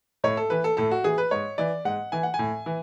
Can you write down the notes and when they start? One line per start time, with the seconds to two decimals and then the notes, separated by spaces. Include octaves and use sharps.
0.24 A2 C#5
0.37 A4
0.50 E3 B4
0.64 A4
0.77 A2 A4
0.91 F#4
1.04 E3 G#4
1.18 B4
1.31 G#2 C#5
1.58 E3 D5
1.85 G#2 F#5
2.12 E3 G#5
2.23 F#5
2.34 G#5
2.39 A2
2.66 E3